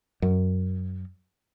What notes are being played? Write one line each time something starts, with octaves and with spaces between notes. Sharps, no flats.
F#2